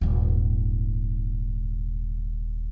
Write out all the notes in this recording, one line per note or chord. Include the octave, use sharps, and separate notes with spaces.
D#1 G#2